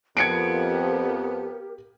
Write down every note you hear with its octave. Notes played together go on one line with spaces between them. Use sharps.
F2 F3 B3 G4 A#4 G#6 C#7 D7